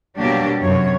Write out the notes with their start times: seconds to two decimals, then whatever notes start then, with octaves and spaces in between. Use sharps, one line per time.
0.17 B2 F#3 G3 A#3 D4 G4
0.63 F#2 C3 C#5